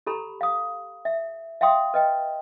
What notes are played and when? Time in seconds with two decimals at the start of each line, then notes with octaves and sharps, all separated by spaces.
0.07 G4 A4 A#5 B5
0.41 F5 D#6
1.05 E5
1.61 E5 F5 G5 C6 D#6
1.94 B4 D#5 G5